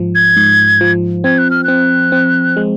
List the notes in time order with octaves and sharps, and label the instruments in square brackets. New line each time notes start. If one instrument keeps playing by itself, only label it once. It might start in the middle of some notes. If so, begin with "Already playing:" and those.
Already playing: [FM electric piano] G#2 F3
[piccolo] G#6
[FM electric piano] G#2
F3
[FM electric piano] C4 [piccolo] G#6
[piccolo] F#6
F6
[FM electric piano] C4 [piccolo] F#6
[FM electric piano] C4
G#3